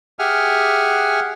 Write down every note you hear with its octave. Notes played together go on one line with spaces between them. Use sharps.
G4 G#4 E5 F#5 G#5 F6